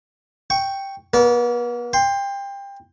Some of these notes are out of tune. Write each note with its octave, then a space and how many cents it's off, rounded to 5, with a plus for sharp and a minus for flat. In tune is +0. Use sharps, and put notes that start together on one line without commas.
G5 +0 C#6 +0
B3 -40 A#4 +0 D5 -35
G5 +25 C6 +0